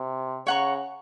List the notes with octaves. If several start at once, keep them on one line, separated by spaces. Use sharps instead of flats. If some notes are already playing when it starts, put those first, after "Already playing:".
Already playing: C3
C#3 C#5 F#5 A#5 C#6